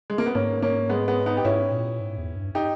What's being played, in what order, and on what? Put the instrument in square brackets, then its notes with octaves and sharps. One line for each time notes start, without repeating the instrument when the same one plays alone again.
[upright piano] G#3
A#3
B3
[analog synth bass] G#2 [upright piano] A#3 C#4
[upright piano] A#3 C#4
G#3 B3
G#3 B3
B3 D#4
G4
[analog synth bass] G#2 [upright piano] C#4 E4
[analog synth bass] A#2
G#2
E2
G2
[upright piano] D#4 G4